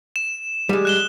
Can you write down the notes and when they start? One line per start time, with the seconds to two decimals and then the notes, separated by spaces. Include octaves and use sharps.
0.16 E7
0.69 G3 G#3
0.85 F#6 E7 G7